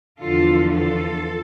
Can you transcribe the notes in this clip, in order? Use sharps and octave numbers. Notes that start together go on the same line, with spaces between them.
E2 D3 F3 F4 A4
F4 A4